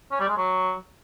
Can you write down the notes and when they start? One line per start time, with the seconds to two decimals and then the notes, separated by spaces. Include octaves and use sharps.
0.11 C#4
0.20 G3
0.28 G#3
0.37 F#3